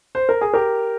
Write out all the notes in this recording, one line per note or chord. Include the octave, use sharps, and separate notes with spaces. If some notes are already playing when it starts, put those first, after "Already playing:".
C5
A#4
G#4
G4 A#4